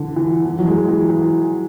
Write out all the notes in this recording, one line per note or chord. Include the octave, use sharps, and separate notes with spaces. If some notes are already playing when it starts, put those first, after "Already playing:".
Already playing: D3 E3
E3
E3
F#3
G#3
E3
E3